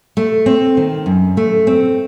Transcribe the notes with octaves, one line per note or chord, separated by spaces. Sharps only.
A3
C4
D#3
F#2
A3
C4